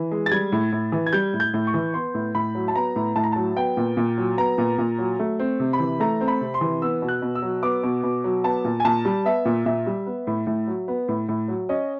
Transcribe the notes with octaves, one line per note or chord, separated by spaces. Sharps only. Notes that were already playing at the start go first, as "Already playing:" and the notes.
Already playing: E3
G#3
A6
G3 G#6
A2
A2
E3
G#6
G3 G6
A2
G6
A2
C#6
E3
B3 C6
A2
A2 B5
F#3
A5
B3 A#5
A2
A2 A5
A#5
F#3 A5
B3 G5
A#2
A#2
F#3
B3 A#5
A#2
A#2
F#3
A3
C4
C3
B5
E3
A3 A#5
C4
B5
C3
C6
E3
B3 E6
B2
F#6
B2
E6
F#3
B3 D6
B2
B2
F#3
B3 A5
A#2
G#5
A#2 A5
G3
B3 E5
A#2
A#2 E5
G3
B3
A2
A2
F#3
B3
A2
A2
F#3
C#4 D#5